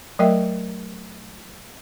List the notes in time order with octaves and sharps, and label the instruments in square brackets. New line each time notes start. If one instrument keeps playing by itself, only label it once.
[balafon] F#3 A3 A#4 D#5 E5 G5